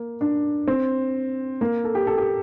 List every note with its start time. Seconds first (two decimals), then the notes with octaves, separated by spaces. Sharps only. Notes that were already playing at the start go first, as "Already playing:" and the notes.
Already playing: A#3
0.21 D4
0.68 C4
1.61 A#3
1.84 A4
1.95 G4
2.07 A4
2.18 G4